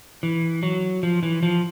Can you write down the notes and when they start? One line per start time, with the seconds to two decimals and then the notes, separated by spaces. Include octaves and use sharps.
0.23 E3
0.63 F#3
1.03 F3
1.23 E3
1.43 F3